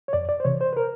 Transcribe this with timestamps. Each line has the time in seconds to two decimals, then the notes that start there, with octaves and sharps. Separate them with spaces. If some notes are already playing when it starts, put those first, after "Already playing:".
0.08 C#5
0.13 F2 D5
0.29 D5
0.40 C5
0.45 C3 E3 C#5
0.61 C5
0.73 B4
0.77 A#4